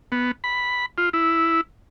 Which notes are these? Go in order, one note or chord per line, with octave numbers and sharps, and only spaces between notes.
B3
B5
F4
E4